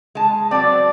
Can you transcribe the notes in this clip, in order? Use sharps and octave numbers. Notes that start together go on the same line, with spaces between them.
G#3 A5
F#3 C4 D5